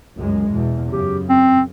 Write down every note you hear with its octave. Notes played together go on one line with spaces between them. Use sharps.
C#2 F#2 G#3
E2 B2
F#2 C#3 G4
C4